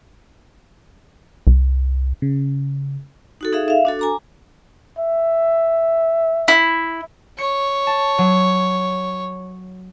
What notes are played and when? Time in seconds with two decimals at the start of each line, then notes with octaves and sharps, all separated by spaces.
1.47 C2
2.22 C#3
3.41 D#4 F#4 A4
3.53 D#4 G#4 A4 E5 F5
3.68 E5 F5
3.85 D4 F#4 A4
3.99 G#5 A#5 D6
4.99 E5
6.48 E4
7.38 C#5 C#7
7.87 A5
8.18 F#3